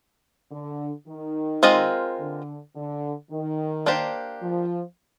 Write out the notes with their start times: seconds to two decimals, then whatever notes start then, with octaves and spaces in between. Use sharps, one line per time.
0.51 D3
1.07 D#3
1.63 G#3 C4 F4 A#4 D#5
2.20 D3
2.75 D3
3.31 D#3
3.86 A#3 D4 G4 C5
4.42 F3